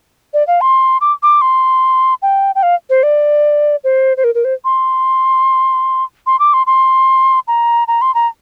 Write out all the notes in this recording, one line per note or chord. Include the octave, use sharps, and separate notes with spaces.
D5
F5
C6
D6
D6
C6
G5
G5
F5
C5
D5
C5
C5
A#4
A#4
C5
C6
C6
D6
C6
C6
A#5
A#5
C6
A#5